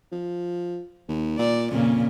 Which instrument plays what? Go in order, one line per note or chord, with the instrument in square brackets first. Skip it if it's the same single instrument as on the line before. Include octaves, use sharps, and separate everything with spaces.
[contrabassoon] F3
D#2
[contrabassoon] A#2 [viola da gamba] D5
[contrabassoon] F2 [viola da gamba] A#2 C#3